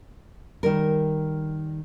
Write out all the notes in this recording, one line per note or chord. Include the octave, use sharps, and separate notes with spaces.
D#3 G3 A#4